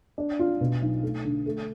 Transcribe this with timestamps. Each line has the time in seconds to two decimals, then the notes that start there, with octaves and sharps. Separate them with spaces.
0.18 D4
0.39 F4
0.61 B2
0.82 B1
1.03 A3
1.25 D3
1.46 A3